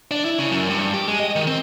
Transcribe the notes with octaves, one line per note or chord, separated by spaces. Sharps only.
D4
E4
C#3
F#2
G2
G4
G#3
D#5
D#3
C4